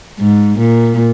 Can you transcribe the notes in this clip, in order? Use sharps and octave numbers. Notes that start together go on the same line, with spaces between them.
G#2
A#2